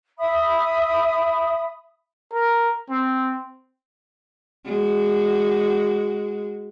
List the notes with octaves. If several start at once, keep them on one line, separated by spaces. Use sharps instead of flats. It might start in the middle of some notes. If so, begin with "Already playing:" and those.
E5 B5 D#6
A#4
C4
G#3 F#4